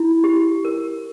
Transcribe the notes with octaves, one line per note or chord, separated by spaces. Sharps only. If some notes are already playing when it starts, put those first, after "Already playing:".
Already playing: E4
G4
A#4